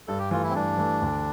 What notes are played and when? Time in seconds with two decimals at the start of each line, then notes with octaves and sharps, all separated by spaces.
0.08 G2 A4
0.19 G4
0.31 E3 A3 F4
0.43 E4
0.49 C4
0.55 G2 D4
0.78 E3 A3
1.02 D2